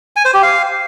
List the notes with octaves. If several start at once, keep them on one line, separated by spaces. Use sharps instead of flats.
G#5
C5
G4
F5